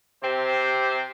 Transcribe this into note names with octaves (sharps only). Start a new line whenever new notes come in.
C3 C4 G4 C5